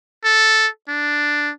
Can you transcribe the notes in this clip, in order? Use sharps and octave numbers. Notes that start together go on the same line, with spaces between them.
A4
D4